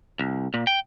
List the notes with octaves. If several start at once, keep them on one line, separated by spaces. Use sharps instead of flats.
C2
A#2
G5